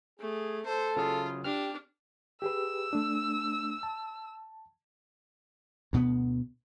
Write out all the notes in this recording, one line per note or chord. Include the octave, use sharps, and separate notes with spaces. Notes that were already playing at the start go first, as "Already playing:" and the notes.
A3 G#4
A4 C5
C#3 F#3 F4 G#4
D4 G4 F6
G4 G#4 B4 E6
A3 D4
A5
D2 B2 G#3 B3